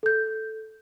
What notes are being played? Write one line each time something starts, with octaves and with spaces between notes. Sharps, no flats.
A4 G6